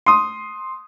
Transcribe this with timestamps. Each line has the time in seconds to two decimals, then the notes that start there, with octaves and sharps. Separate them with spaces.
0.06 C6 D#6